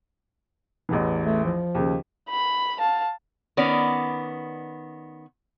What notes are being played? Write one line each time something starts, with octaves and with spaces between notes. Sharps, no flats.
A1 E2 E3
A3
F3
D#2 C#3
B5
F5 A5
D#3 B3 C#4 D5